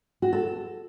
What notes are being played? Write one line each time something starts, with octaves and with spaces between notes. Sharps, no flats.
F#4
A4